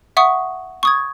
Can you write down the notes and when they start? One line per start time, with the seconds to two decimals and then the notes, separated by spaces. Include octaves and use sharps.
0.17 E5 F#5 C#6 D#6
0.83 C#6 D#6 G#6